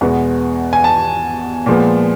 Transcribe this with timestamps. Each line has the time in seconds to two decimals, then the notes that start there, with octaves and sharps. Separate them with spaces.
0.01 E2 B2 G#3 B3
0.73 G#5
0.84 A5
1.66 A#2 F3 G#3 B3